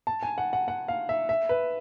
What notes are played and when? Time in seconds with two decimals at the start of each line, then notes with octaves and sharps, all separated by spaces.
0.07 A5
0.23 G#5
0.38 F#5
0.53 F#5
0.68 F#5
0.88 F5
1.09 E5
1.29 E5
1.49 B4